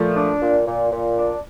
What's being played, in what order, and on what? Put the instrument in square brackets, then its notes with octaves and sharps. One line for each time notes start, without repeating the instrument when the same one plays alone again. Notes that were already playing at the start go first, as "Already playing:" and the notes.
Already playing: [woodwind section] A#2 [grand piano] F3 A3
[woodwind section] D4
A#2
A#2
A#2
D4